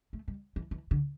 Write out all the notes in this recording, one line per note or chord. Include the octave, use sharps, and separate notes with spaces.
A3
G3
E3
E3
D3